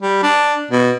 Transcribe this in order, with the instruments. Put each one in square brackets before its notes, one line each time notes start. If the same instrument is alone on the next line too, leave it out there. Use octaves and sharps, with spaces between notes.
[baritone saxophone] G3
D4
B2